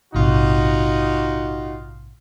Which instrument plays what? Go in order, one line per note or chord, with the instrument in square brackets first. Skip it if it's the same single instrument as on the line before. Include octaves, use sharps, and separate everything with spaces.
[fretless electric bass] A#1 G#2 C3 [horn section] D#4 F4 F#4